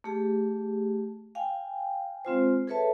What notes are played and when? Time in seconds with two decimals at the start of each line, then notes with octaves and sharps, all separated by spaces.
0.04 A3 G4 G#4
1.35 F5 G5 G#5
2.25 G#3 C4 F4 C5
2.67 G#4 A4 B4 C#5 E5 A5